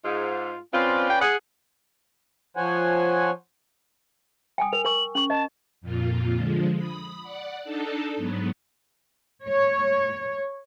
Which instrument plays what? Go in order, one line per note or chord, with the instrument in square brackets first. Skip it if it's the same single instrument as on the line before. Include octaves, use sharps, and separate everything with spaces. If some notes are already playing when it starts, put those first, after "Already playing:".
[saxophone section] G#2 [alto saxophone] F4
[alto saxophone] C4 [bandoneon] C#4 B4 D5 [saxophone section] F4
[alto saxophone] G5
[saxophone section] G#4 [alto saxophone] F#5
[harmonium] F3 C5 C#5 F#5 G#5
[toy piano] G5 G#5 D#6
[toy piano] A#4 [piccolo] F7
[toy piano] A#4 C#6 [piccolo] F#7
[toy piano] C#4 C#6 [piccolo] F#7
[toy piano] D#5 [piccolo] A5
[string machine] F2 A#2 F4
D3 F3 G#3
B5 D#6
D5 F#5
D4 D#4 A4 A5
G#2 F#3 B3
[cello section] C#5